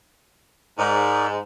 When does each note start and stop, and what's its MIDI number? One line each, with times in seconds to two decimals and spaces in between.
0.79 1.37 44
0.79 1.27 63
0.79 1.27 70
0.79 1.27 74